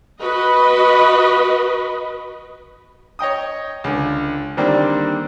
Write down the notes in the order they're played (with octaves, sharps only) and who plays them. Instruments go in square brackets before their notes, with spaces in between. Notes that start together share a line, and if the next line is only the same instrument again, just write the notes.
[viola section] F#4 B4 D#5
[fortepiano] C#5 D#5 G5 D#6
C#2 D3
D3 D#3 G3 A#3 C4 D4